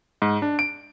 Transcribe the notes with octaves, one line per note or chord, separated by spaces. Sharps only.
G#2
D4
D7